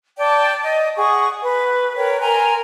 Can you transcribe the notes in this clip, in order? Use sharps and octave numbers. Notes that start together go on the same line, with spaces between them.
D5 G5 A5
D#5
G#4 F#5 C#6 D#6
B4
A#4 B4 C#5 G5
A#4 G#5 A#5 C6